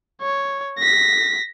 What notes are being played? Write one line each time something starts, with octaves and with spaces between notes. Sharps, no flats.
C#5
A#6 B6